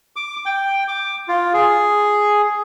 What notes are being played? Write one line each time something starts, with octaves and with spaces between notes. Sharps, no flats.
D6
G5
D6
F4
G#4